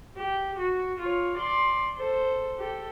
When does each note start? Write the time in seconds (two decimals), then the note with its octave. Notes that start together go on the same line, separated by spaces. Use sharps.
0.17 G4
0.59 F#4
1.00 F4 C#5
1.37 D5 C6
1.96 A4 C5
2.58 G4 A4